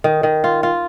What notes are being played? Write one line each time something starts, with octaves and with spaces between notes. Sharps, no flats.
D#3
D#3
F4
F4